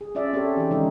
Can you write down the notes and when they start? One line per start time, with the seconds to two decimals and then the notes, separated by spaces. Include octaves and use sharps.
0.01 G#4
0.15 C#4 F4 D5 E5
0.33 C4 G4 A4 C#5
0.57 E3 D#4
0.71 D#3 F3 G#3 C4 C#4 D#4